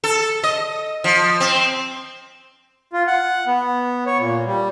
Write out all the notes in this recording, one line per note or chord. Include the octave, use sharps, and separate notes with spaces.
A4
D#5
F3
C4
F4
F#5
B3
C#5
A#2
G3